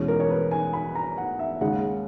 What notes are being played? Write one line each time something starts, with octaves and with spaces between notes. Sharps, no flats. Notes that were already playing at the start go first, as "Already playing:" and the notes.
Already playing: E2 B2 G#3 C#4
A#4
C#5
B4
G#5
B5
A#5
F#5
E5
D#2 C#3 G#3 F#5